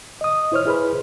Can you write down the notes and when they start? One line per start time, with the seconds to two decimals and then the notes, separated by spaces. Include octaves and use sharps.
0.21 D#5 D#6
0.52 E4 C5 C#5 F6
0.65 E4 G#4 B4 C5 B5